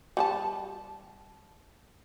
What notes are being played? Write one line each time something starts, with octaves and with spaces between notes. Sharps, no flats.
G3 G#4 A5